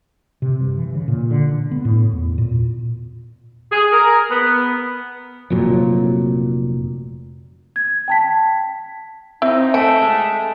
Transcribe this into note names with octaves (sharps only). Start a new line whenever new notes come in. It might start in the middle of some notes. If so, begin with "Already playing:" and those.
C3
G2
E3
C#3
A#2
D3
B3
A2
E2
A#2
G#4
A#4
B3
F1 F2 A#2 F#3
G#6
G5 A5 B6
C4 D#4 E4
A3 F#5 G#5 A5 D7
G#3